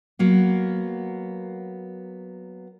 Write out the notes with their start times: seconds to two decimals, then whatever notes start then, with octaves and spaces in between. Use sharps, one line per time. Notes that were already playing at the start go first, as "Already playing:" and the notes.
0.19 F#3 A#3 B3